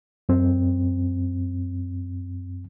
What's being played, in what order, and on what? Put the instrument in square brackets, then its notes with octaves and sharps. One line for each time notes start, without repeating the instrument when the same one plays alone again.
[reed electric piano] F#2 C4